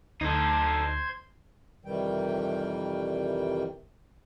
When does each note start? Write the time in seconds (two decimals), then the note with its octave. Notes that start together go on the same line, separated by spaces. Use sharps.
0.21 D2 D#4 A4 C5 C6 G#6
1.85 F2 C3 D#3 E3 G3 G5